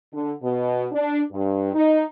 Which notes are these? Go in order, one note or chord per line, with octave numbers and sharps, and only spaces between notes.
D3
B2
D4
G2
D#4